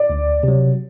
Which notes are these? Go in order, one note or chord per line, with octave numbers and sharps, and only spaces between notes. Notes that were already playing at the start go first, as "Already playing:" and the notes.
Already playing: D5
D2
C3 F#3